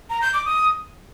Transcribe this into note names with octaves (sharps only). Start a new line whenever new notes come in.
A#5
G6
D6
D#6